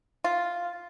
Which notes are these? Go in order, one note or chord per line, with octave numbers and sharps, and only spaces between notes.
F4